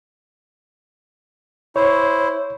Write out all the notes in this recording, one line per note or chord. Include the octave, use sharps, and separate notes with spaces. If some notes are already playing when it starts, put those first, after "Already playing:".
E4 C5 C#5